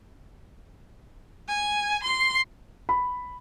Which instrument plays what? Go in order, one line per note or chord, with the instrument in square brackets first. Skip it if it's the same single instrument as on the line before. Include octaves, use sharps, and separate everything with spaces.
[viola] G#5
C6
[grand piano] B5